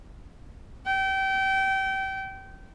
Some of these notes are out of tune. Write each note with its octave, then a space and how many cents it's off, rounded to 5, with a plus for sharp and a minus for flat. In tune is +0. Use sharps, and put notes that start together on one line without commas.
G5 -25